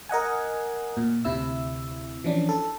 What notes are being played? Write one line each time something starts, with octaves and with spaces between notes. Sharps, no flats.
A#4 D#5 F#5 G#5
A#2
D2 C3 E4 E6
E3 F3 C#4 D4
A4